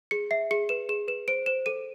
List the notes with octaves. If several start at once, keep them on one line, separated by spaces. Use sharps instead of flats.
G#4 C#7
E5 C7
G#4 C#7
B4 E7
G#4 E7
B4 E7
C5 D7
C5 E7
A4 D#7